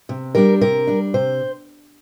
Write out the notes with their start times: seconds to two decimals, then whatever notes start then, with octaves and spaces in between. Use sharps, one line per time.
0.09 C3
0.35 G3 D4 A#4
0.61 C3 A#4
0.87 G3 D4
1.14 C3 C5